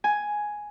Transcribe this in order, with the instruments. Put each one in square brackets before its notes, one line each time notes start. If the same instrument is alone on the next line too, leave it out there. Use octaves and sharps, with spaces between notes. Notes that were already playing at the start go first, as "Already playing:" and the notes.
[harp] G#5